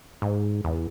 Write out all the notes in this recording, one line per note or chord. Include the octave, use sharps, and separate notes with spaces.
G#2
E2